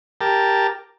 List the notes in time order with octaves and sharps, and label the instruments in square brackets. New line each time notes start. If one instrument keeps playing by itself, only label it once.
[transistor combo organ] G4 A#4 A5